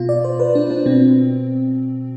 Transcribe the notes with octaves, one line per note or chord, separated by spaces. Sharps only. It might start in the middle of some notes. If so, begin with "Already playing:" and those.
Already playing: B2 F4
D5
C5
B4
D4
D4
B2 C4